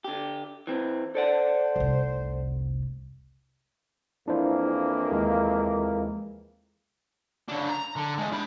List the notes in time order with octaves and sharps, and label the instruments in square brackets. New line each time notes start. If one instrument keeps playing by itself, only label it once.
[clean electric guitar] D3 G4
E3 C4
[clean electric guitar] A4 D5 F#5 [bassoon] C5
[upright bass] F1 C2
[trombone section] F2 E3 A#3 [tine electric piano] D4 E4 C5
[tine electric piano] D#2 G#3
[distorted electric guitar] C#3 D4
A#5
D3
E2 G#3
D4 B5